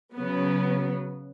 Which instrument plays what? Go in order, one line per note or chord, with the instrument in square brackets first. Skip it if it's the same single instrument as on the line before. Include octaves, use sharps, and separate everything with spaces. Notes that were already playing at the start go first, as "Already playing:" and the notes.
[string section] C#3 F#3 B3